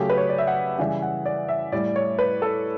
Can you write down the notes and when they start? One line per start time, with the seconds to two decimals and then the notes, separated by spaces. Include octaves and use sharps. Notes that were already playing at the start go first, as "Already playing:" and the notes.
Already playing: C#3 F#3 A3 G4
0.10 B4
0.18 C#5
0.29 D5
0.38 E5
0.47 F#5
0.78 C#3 E3 G3 E5
1.02 F#5
1.26 D5
1.49 E5
1.72 A2 G3 D5
1.96 C#5
2.19 B4
2.42 A4